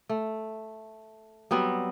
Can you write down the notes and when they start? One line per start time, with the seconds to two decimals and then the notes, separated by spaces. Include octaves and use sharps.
0.09 A3
1.51 F#3 G3 B3 C4